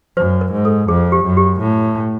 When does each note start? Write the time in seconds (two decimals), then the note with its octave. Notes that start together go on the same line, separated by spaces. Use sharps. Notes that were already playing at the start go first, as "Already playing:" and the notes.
0.17 F#2 C5
0.41 A#4
0.53 G#2
0.65 A4
0.88 F2 G#4
1.12 G4
1.25 F#2
1.37 G4
1.60 A2